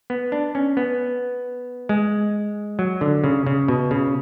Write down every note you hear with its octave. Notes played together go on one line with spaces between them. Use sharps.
B3
D4
C#4
B3
G#3
F#3
D3
C#3
C#3
B2
C#3